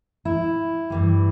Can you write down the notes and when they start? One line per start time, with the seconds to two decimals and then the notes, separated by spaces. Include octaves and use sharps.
0.25 E4
0.90 G2 E3 G3